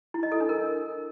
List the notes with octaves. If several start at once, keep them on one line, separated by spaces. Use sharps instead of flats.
E4
D#5
A4
D4
A#4